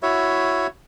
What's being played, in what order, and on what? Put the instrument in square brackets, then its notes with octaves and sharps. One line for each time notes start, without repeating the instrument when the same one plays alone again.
[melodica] E4 F#4 C#5 E5